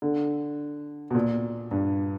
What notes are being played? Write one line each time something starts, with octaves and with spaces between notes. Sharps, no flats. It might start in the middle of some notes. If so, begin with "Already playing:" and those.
D3
B2
A#2
G2